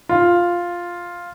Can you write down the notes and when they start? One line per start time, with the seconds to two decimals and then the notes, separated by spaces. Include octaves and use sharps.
0.09 F4